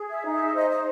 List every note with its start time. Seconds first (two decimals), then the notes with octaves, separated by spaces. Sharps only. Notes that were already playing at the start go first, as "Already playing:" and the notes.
Already playing: G#4
0.09 E5
0.25 D#4
0.32 E5
0.54 C5 D#5
0.70 D#5